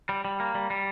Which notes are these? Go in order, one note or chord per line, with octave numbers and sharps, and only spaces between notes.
G3
G3
A#3
G3
G3